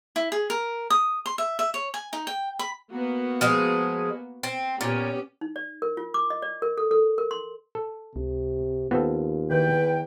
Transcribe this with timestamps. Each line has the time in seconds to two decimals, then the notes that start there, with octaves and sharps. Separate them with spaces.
0.16 E4
0.32 G#4
0.50 A#4
0.90 D#6
1.26 C6
1.38 E5
1.59 E5
1.74 C#5
1.94 G#5
2.13 D#4
2.27 G5
2.59 B5
2.90 A#3 B3 F#4
3.41 F3 G#3 G#4
4.43 C4
4.81 A#2 B3 C#4 G4
5.41 D#4
5.56 D5
5.82 A#4
5.97 F4
6.14 D6
6.30 D#5
6.42 D5
6.62 A#4
6.78 A4
6.91 A4
7.18 A#4
7.31 C6
7.75 A4
8.16 C#2 C3
8.91 D#2 B3 C4 F4 A4
9.51 E2 D#3 B4 G5